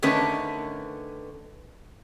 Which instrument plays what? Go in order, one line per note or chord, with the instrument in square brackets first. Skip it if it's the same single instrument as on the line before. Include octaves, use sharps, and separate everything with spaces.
[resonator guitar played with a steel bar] D3 D#3 A3 C#4 A#4 B4